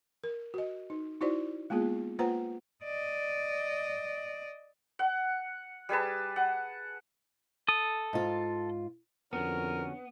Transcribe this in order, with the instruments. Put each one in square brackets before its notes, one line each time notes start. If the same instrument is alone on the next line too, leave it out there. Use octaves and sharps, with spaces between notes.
[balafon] A#4
F#4 D#5
D#4
D#4 E4 F#4 C5 D5
G#3 A#3 B3 F4 G#4
A#3 F4 B4 C5 F#5 A#5
[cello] D5 D#5
[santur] F#5
G3 G#4 B4 A5
F#5
[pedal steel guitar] A4 D#6
[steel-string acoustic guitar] G#2 F4
[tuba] F2 [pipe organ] D3 C#4 F#4 [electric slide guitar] B3 [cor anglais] A#4